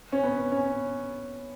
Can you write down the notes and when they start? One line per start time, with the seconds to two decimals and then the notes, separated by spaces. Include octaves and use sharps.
0.12 C#4
0.23 B3
0.52 C#4